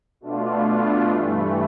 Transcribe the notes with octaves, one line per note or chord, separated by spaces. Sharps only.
B2 A3 D4 F4
G2 E3 A3